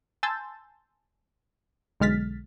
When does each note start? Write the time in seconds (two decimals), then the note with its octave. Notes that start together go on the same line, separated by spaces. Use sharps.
0.23 G#5 A5 C6 E6 G6 A6
2.00 B1 D3 G#3 F6 A6 B6